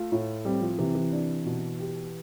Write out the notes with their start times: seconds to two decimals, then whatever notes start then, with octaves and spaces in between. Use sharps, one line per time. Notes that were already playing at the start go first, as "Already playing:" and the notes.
Already playing: A3 F4
0.12 A2
0.45 G3 C4
0.62 F3
0.78 C3 E3
0.95 E3
1.12 D4
1.46 B2
1.79 G4